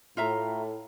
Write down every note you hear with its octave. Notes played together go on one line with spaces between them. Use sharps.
A2 F4 E5 A#5